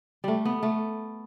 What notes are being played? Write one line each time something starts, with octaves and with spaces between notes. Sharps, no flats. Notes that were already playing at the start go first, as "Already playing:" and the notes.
G3 A3
B3
A3